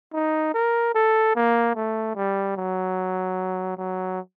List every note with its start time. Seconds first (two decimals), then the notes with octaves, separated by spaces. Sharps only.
0.13 D#4
0.54 A#4
0.95 A4
1.36 A#3
1.75 A3
2.15 G3
2.57 F#3
3.77 F#3